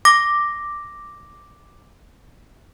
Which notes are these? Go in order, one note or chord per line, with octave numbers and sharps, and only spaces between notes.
D6 A#6